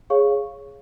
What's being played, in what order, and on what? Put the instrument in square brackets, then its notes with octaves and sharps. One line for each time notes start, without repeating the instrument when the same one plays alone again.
[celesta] G#4 C#5 F5 C#6